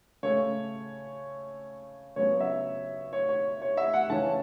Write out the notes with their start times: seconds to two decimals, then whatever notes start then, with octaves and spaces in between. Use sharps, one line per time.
0.23 C#3 A3 C#4 C#5
2.16 C#3 F#3 B3 C#5
2.40 E5
3.13 C#5
3.29 C#5
3.62 C#5
3.77 E5
3.94 F#5
4.10 C#3 E3 C#4 A5